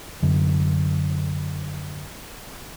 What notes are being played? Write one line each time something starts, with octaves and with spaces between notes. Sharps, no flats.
F#2 D3